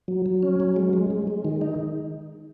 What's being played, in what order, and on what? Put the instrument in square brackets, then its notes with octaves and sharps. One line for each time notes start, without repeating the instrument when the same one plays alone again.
[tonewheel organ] F#3
F#3
C#4
F#3
G#3
G#3
G#3
G#3
D#3
D#4